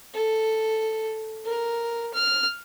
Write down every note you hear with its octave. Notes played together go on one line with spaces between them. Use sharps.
A4
A#4
F6